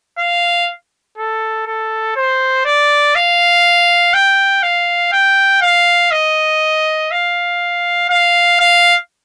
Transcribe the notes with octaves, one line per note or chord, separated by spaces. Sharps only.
F5
A4
A4
C5
D5
F5
G5
F5
G5
F5
D#5
F5
F5
F5